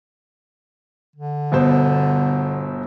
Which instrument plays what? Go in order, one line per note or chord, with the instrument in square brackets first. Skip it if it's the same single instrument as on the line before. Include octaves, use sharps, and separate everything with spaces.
[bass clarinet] D3
[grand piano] G1 B2 C5